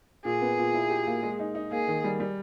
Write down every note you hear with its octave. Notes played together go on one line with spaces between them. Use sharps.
A#2 G#4
B3
A#2
E4
G4
A#3
G#3
D#4
D#4
A#3 G#4
D#3
G3
G3